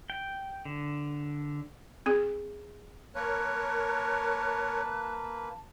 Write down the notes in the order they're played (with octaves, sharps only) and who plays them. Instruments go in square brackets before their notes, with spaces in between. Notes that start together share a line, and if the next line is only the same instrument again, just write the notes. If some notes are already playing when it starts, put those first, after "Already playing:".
[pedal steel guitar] G5
D3
[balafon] C4 G#4
[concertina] A#3 B4 [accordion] A#4 C#5 [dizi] A5 [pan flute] F#6